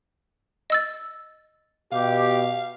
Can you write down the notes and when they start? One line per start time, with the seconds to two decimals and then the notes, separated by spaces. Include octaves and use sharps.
0.70 D#5 E6 A6
1.92 B2 G4 F5